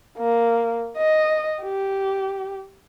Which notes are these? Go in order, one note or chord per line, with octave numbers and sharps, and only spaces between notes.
A#3
D#5
G4